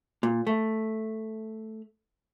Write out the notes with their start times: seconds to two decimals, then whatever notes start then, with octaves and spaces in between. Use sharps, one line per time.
0.23 A#2
0.47 A3